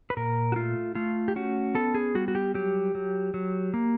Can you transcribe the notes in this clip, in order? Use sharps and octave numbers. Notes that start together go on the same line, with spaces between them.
B4
A#2 A#4
F#4
A3 F4
A3 F4
G4
C#4 F#4
B3 A4
G#4
G3 F#4
F#4
G4
F#3 G4
F#3
F#3
A#3